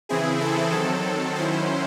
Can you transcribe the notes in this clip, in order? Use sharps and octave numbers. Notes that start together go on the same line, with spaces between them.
C#3 E3 C4 E4 G#4
A4
D#3 F#3 C4 A4
D#3 F#3 C#4 E4 C5